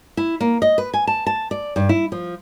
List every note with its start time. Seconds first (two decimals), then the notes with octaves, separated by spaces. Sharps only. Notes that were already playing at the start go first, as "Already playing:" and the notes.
0.17 E4
0.40 A#3
0.62 D#5
0.78 B4
0.94 G#5
1.07 A5
1.26 A5
1.51 D5
1.76 G2
1.89 E4
2.12 F3